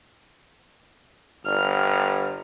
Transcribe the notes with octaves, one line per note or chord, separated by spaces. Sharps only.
G1 F6